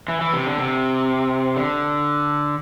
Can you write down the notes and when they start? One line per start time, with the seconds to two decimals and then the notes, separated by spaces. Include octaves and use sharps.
0.08 E3
0.21 E3
0.33 C3
0.46 D3
0.58 C3
1.56 D3